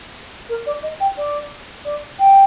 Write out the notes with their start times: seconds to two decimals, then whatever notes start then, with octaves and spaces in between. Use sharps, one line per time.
0.49 A#4
0.66 D5
0.83 D#5
1.00 G5
1.18 D5
1.85 D5
2.19 G5